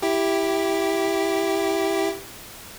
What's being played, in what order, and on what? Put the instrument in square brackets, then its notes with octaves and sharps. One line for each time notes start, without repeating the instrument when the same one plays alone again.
[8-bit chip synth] E4 G4